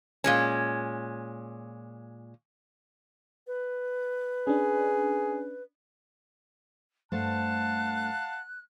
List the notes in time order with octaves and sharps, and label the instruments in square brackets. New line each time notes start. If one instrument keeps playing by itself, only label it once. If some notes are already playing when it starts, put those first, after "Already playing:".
[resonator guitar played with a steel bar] A#2 G#3 C#4
[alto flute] B4
[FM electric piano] C#4 D4 [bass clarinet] G#4
[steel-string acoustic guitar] G2 A3 C5 [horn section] F5 F#5 A5 [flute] F#6